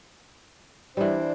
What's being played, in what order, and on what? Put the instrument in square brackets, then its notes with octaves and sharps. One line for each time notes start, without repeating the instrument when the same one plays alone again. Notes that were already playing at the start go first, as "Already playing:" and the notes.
[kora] E3 G3 [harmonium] D4 C5